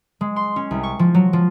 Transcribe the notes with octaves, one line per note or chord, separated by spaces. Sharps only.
G#3
C6
C#4
C2
C#6
F3
F#3
F3